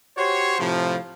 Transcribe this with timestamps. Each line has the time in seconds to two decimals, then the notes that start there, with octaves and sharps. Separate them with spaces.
0.17 F#4 G4 C5 C#5
0.59 A2 C3 F3